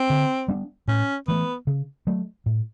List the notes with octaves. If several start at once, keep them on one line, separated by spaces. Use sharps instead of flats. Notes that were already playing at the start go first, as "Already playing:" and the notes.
Already playing: C4
D3
G3 B3 D4
A2 C#4
E3 A3 B3
C#3
F#3 A3
A2